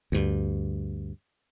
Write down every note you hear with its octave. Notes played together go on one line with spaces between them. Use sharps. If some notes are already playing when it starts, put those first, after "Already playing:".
D2 G2